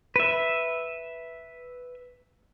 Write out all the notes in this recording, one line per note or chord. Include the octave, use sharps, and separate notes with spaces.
B4 E5